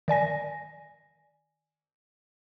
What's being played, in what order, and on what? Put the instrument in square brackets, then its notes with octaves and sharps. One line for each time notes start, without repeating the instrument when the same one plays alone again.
[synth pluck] D#3 D5 G#5 A#6